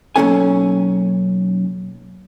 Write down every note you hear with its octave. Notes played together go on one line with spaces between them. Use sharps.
B1 F#3 A#3 C#4 A4 G#5